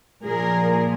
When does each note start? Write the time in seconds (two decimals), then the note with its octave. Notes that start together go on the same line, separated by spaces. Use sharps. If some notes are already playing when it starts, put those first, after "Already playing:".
0.23 A#2 F3 G#4 A#4